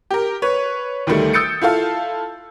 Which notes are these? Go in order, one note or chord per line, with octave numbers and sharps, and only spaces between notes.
G4 A#4
B4 C#5
D2 D#3 G3 A3
D#6 E6 G6 A6 C#7 D7
E4 F4 A4 F5